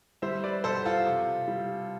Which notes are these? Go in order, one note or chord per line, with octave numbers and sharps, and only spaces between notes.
G3 C5 E5
B4 D5
B2 A4 C5
F4 A4
C3
G3